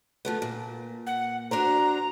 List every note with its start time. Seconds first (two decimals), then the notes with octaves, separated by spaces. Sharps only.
0.25 F3 A3 B3
0.42 A#2
1.07 F#5
1.51 D4 F#4 C5 A#5